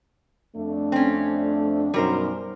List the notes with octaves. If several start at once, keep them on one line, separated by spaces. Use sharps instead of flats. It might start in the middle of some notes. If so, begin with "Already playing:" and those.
F2 A3 D4
C4 C#4
F#2 B2 G3 D#4 A#4 C5